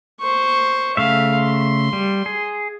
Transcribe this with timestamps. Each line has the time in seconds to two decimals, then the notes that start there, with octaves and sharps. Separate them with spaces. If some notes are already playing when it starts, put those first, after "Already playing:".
0.20 C5 C#6
0.97 C#3 A3 E5 F5
1.36 C6
1.93 G3
2.26 G#4